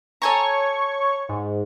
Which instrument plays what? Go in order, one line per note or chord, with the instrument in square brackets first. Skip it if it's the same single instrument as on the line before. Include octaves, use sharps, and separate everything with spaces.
[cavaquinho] A4 G#5 A#5 [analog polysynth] C#5 C#6
[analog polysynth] G#2